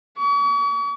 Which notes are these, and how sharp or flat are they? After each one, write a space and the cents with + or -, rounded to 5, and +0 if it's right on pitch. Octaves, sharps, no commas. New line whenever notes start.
C#6 +45